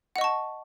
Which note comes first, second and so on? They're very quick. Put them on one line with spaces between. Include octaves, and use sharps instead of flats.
F#5 D#5 C#6 A5